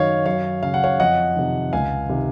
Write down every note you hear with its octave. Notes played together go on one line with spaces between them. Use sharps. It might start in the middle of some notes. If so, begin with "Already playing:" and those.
Already playing: F#2 D#3 C#5 D#5 F5
F#2 C#5 F5
C#3 F5
F#5
C#5 F5
F2 D#5 F#5
C3 D#3
C#2 F5 G#5
C3 D#3